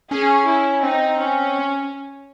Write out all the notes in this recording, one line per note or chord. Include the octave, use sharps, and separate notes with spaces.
C#4 G#4
E4
C4 D#4
C#4